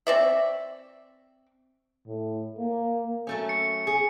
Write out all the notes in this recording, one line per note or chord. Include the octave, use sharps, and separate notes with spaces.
C4 D5 E5
A2
A#3
F#3 A3 C#4
C#7
G#4